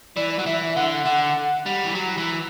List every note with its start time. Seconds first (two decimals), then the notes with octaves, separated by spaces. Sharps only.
0.16 E3 D5
0.39 F#3
0.46 E3 E5
0.67 E5
0.76 D3 F#5
1.05 D3 F#5
1.66 G3
1.84 E3
1.95 F#3
2.17 E3